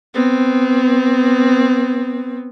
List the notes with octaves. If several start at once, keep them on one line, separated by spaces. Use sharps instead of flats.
B3 C4